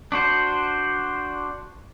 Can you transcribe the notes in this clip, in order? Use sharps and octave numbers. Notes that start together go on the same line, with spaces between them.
D4 F#4 C5